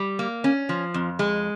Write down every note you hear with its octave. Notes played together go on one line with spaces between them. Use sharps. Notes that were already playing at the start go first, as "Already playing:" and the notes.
Already playing: G3
A#3
C#4
F3
F2
G#3